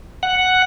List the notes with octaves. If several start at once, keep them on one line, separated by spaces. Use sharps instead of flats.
F#5